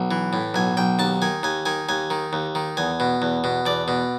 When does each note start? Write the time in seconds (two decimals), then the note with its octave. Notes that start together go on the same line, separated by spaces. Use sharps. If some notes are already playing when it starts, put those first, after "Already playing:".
Already playing: B1
0.11 E3
0.33 A2
0.54 B1 G#5
0.77 B1 G5
0.99 D#2 A5
1.22 D#3 G#5
1.43 D#2 G#5
1.65 D#3 G#5
1.89 D#2 G#5
2.10 D#3
2.33 D#2
2.55 D#3
2.77 E2 G#5
3.00 B2
3.22 E2
3.44 B2
3.66 E2 D5
3.88 B2